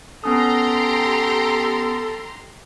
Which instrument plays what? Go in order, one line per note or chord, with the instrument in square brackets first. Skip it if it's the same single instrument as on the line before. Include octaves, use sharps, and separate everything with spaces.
[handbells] B3 C#4 D#6 [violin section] G4 A#5 C6 [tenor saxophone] A4